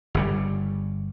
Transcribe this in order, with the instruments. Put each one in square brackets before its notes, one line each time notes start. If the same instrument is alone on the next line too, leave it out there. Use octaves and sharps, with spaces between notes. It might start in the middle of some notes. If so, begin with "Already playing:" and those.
[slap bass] G1 C#3 G3